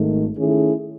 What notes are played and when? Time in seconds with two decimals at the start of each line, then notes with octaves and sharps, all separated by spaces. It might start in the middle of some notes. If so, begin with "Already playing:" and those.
Already playing: G#1 G#2 D#3 A3
0.37 D#3 A3 C#4 E4 G#4